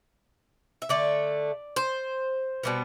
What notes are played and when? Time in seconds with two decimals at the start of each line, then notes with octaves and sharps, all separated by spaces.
0.82 E5
0.89 D3 A3 D5
1.76 C5
2.63 B2 G3 B3